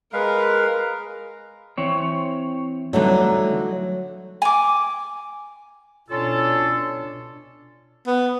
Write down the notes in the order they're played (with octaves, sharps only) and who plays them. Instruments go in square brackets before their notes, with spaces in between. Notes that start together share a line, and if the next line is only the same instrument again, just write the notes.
[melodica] G#3 B4 F5 [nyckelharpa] A#4
[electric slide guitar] E3 C4 C#5
[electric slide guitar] D3 E3 G3 [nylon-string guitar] F#3 A3 D#4
[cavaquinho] G#5 D6
[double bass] B2 D4 [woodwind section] C#4 F4 A4
[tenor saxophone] B3